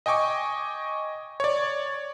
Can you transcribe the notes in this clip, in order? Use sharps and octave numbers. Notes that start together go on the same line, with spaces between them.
D#5 G5 G#5 C#6 D6
C#5 D5